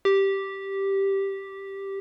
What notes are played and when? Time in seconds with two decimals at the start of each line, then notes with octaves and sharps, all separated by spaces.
0.05 G4